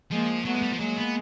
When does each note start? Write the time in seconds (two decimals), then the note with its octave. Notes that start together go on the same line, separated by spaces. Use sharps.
0.11 F3 G#3 A#3
0.45 F#3 A3 B3
0.55 G#3
0.63 G3
0.72 F3
0.80 F#3 G#3 A#3
0.97 B3